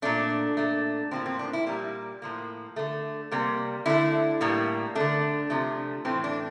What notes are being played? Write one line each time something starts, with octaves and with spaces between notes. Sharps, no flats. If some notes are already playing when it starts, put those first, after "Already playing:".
A#2 A3 D4
A#2 A3
A2 F3 A#3 C4
C4
D4
E4
A#2 G3 A#3
A2 F3 A#3
D3 A3
C3 G3 A#3
D3 A3 E4
A2 G3 A#3
D3 A3 D4
C3 F3 A3
A2 E3 A3 C4
D4